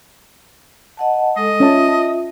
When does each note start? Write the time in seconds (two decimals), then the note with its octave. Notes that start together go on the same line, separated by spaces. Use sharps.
0.97 D#5 F#5 A5
1.36 G#3 A4 D#5
1.60 C#4 F4 C#5 E5 A5
1.89 A5